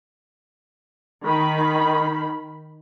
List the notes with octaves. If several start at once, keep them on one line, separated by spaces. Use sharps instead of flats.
D#3 B5